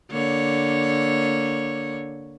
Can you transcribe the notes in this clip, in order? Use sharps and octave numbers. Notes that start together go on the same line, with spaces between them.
D3 A#3 C#5